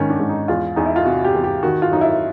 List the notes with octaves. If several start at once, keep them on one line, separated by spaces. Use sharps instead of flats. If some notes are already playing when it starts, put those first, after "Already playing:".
Already playing: G#2 D#3 C#4
D4
G#2
D#4
E2 F4
E2 D#4
E4
F4
C3 F#4
G4
E2
G4
D#3 F#4
F4
F#2 D#4
E4